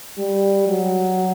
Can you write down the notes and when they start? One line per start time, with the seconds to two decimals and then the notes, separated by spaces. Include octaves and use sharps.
0.18 G3
0.68 F#3